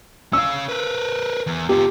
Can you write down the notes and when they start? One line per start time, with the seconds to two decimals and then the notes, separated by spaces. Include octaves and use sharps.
0.33 C#4 F5 E6
0.69 A#4 B4
1.47 E2
1.69 B3 F4 G4